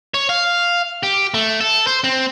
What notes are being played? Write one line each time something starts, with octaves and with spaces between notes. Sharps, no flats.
C#5
F5
G4
A3
A4
C5
C4